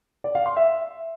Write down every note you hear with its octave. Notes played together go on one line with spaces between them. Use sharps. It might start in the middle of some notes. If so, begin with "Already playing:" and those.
D5
F5
C6
E5